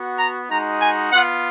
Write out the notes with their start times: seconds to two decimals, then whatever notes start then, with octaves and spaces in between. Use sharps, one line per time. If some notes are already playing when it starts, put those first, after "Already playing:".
Already playing: B3 F#4
0.17 A#5
0.48 G#3 D#4 F#4 A#5
0.79 G#5
1.10 B3 F4 F#5